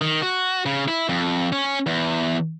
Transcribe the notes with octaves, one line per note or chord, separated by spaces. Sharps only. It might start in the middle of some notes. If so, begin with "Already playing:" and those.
D#3
F#4
C#3
E4
F2
C#4
E2